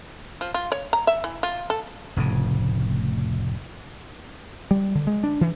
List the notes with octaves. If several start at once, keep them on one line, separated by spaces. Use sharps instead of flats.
F3
F4
C#5
A#5
E5
E3
F4
A4
F1 A2 C#3
G3
D3
G#3
D4
E3